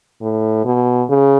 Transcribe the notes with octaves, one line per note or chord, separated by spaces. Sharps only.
A2
B2
C#3